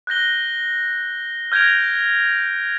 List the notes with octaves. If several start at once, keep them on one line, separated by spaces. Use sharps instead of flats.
F#6 G6 A#6 G7
F6 G6 G#6 A#6 D7 F7